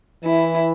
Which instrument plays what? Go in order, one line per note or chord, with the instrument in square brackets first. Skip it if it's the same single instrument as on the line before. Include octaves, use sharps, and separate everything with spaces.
[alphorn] E3 [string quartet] E4